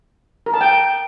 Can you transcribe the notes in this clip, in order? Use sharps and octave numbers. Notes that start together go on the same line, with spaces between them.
A#4
A5
G5